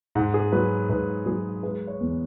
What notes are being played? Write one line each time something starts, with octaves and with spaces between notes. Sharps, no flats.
G#2 F#5
G#4
F#3 B4
G#2 B4
F#3 G#4
G#3 B4
C#5
E2